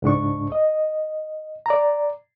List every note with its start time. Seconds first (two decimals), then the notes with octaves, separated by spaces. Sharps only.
0.02 C#2 G#2 D4 C#6
0.52 D#5
1.66 D5 A#5